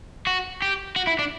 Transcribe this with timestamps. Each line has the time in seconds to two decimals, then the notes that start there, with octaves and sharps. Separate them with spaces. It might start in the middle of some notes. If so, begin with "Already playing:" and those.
0.27 F#4
0.62 G4
0.96 F#4
1.07 E4
1.19 D4